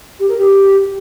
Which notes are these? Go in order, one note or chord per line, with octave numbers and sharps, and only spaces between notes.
G4
A#4
G4